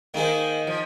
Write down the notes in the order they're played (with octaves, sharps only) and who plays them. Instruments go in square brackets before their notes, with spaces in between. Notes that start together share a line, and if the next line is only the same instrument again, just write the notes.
[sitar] D#3 [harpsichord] A#3 D#4 G#4 C5
[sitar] F3